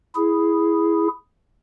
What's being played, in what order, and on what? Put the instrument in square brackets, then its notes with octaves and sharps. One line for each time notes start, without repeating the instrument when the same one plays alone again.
[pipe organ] E4 G#4